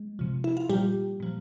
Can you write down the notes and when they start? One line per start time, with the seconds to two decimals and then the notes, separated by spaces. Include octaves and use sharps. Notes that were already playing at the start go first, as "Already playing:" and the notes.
Already playing: G#3
0.19 C3 F3
0.44 E4
0.57 F4
0.69 A#2 F3 G3 G4
1.20 A#2 F3